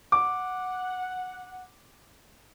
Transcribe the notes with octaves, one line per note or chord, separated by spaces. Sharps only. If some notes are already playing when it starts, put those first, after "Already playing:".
F#5 D6